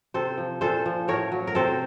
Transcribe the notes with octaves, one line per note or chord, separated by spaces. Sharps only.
C3 A4 C5
F3
A#2 A4 C5
F3
A2 A#4 C#5
F#3
A#4
C3 A4 C5